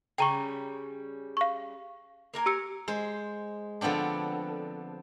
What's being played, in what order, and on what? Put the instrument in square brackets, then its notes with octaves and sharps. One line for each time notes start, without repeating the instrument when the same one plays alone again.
[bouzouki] C#3 G3 C#4 [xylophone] G5 A#5 C#6
[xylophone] F5 C#6
[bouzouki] A#3 A#4 G#5
[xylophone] G4 E6 C#7
[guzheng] G#3 C5
D3 F3 B3 C4 D4